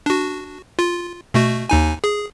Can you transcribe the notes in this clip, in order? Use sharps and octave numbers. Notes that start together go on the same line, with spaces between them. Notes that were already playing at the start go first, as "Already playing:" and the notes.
D4 F#4
F4
B2 A3 F#4
D#2 D#4 G#5
G#4